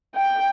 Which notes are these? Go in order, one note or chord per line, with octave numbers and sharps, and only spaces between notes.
G5